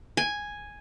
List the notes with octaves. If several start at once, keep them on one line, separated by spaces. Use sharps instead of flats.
G#5